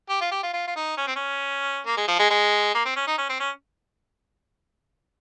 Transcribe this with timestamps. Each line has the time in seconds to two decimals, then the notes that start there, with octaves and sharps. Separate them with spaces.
0.10 G4
0.21 F4
0.32 G4
0.43 F4
0.54 F4
0.67 F4
0.76 D#4
0.97 C#4
1.07 C4
1.16 C#4
1.86 A#3
1.97 G#3
2.08 F3
2.19 G#3
2.30 G#3
2.75 A#3
2.85 C4
2.96 C#4
3.07 D#4
3.18 C#4
3.29 C4
3.40 C#4